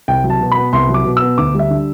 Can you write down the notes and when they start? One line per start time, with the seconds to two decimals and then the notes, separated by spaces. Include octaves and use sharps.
0.08 C2 G5
0.24 F#3
0.30 A5
0.41 B2
0.52 B5
0.57 B3
0.73 C2 C6
0.89 F#3
0.94 D6
1.05 B2
1.17 B3 E6
1.38 D2 D6
1.54 G3
1.59 E5
1.70 D3